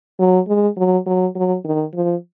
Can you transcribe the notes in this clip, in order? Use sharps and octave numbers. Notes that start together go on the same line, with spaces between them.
F#3
G#3
F#3
F#3
F#3
D#3
F3